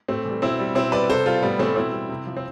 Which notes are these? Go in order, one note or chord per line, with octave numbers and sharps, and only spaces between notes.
A2 A3 C4
E3 G3
B2 C4 E4
G3
B2 C4 E4
G3 B4 D5
C3 A4 C5
G3 F4 A4
A2 G3 B3
E3 G3 A3 C4
B2 C4 E4
G3
C3
F3
C4